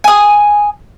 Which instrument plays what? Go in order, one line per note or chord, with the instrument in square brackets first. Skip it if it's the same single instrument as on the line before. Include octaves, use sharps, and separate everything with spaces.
[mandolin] G#5 D#6